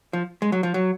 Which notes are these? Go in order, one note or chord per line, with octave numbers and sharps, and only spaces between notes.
F3
G#3
F#3
F3
F#3